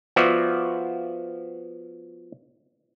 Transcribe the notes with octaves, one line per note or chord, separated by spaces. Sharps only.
F3 B3 F#4 D5 E5